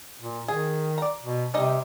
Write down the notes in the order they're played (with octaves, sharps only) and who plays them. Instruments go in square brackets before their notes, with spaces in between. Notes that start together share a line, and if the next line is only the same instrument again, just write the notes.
[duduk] A#2
[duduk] D#3 [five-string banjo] G#4
[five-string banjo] D5 A#5
[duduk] B2
[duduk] C3 [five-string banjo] G3 D#4 D#5